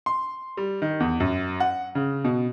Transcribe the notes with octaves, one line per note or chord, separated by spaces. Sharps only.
C6
G3
D#3
E2
F#2
F#5
C#3
B2